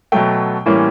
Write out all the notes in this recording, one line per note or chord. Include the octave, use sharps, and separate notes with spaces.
B2 F#3 A3 G5
A2 E3 G3 A#3 C#4